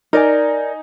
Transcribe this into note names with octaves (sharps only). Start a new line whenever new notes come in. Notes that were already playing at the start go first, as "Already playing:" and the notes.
D#4 A#4 D5 G#5